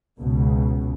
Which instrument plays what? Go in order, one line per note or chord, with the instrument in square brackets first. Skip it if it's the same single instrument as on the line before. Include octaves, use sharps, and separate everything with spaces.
[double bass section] C#2 B2